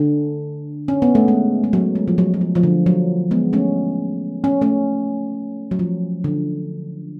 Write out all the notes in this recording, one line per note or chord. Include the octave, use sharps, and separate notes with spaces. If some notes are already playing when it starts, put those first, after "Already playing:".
Already playing: D3
C#4
B3
A3
G#3
G#3
F#3
G#3
F3
F#3
F#3
F3
F3
D3
F#3
G#3 B3
A3 C#4
C#4
A3 C#4
F#3
F3
D3